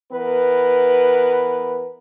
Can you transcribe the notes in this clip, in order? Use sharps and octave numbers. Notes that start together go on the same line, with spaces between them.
E3 B3 A#4 B4